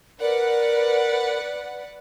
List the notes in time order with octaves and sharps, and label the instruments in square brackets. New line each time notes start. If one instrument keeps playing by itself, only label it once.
[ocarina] A#4 [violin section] B4 D5 F#5